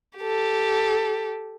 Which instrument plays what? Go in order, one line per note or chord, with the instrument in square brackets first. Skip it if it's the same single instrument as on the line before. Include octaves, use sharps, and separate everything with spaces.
[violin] G4 A4